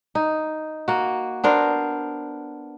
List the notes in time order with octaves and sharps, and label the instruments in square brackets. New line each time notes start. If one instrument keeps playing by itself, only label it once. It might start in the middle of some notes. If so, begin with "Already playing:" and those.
[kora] D#4
A#3 F#4
B3 D4 A#4 C5